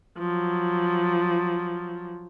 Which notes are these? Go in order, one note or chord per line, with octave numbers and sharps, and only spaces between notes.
F3 F#3